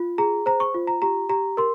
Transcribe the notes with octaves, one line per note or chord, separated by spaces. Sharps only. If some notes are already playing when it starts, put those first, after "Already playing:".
Already playing: F4
G#4 A#5
C5 A#5
C#6
F4
A#5
G4 A#5
G4 A#5
A#4 C6